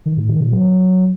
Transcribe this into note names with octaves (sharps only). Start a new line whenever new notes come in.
D#3
A2
D#3
A#2
F#3